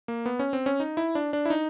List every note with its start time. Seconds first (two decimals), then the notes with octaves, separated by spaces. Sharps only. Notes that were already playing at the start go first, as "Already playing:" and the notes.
0.08 A#3
0.26 B3
0.39 C#4
0.53 C4
0.66 C#4
0.80 D#4
0.97 E4
1.15 D4
1.33 D4
1.45 E4
1.50 D#4